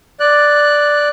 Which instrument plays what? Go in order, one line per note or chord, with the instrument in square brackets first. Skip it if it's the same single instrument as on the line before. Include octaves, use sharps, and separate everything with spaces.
[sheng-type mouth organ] D5 F#6